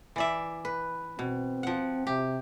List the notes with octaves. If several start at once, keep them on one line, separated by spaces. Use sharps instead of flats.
E3 D5 E5
B4
B2 C4
F3 F#5
C3 G4